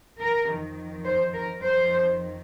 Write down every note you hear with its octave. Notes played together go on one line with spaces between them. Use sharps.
A#4
F2 D#3
C5
A#4
F2 D#3 C5